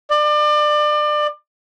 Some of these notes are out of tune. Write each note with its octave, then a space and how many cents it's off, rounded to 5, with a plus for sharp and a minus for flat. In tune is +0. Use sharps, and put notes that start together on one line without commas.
D5 +30